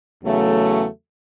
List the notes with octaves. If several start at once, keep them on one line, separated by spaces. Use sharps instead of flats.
E2 C#3 F#3 A3